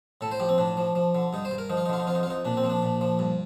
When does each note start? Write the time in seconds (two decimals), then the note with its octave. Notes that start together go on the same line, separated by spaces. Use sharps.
0.21 A2 A4
0.31 C5
0.40 F3 G4
0.49 C4
0.58 A2 D4
0.77 F3
0.95 F3
1.15 D3
1.33 G2 D#4
1.45 C5
1.51 G2
1.58 A#4
1.70 F3 D#4
1.77 F4
1.86 D#4
1.89 D3 F4
2.00 D#4
2.07 F2 F4
2.15 D#4
2.23 F4
2.26 F2 D#4
2.45 A#2 D4
2.57 C4
2.64 F3
2.70 D4
2.82 A#2
3.01 F3
3.19 G2